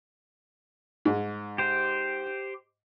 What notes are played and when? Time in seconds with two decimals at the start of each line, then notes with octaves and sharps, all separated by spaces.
1.05 G#2
1.58 G4 C5